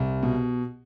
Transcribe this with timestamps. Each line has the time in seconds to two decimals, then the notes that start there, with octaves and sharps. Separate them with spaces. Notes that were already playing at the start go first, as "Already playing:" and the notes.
Already playing: C2
0.23 B2